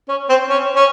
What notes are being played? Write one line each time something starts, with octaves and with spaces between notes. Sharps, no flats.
C#4
C4
C#4
C#4